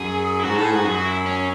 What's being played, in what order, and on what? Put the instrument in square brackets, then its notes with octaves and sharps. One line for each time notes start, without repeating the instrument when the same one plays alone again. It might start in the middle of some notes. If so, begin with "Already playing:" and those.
Already playing: [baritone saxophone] F#2 [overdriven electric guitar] G#4
[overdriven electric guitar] E4
[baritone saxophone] G#2 [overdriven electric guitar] F#4
[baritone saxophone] A2 [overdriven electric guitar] A4
[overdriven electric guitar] G#4
[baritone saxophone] G#2 [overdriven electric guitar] F#4
[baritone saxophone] F#2 [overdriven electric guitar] G#4
[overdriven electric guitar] F#4
E4
C#4